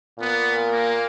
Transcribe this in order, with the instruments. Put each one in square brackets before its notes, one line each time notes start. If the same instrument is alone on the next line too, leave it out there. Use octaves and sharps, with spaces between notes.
[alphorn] A#2 [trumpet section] B3
[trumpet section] A#3